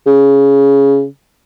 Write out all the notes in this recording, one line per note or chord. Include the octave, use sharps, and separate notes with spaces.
C#3